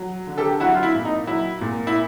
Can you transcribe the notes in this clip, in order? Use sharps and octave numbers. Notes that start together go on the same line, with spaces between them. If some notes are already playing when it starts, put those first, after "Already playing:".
Already playing: F#3
D3
G4 A4
F#3 E4 F#4
F4
E4
A#2
D#4
F#3 E4
A#2
E4